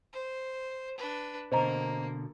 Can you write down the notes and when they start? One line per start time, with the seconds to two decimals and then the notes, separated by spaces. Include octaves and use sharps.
0.13 C5
0.98 D4 B4
1.52 B2 D3 A#3 C5 D#5 A#5